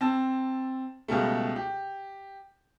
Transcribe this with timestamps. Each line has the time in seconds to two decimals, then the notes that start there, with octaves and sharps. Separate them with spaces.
0.01 C4 A5 E6
1.08 C#2 B2 G3 A3
1.56 G4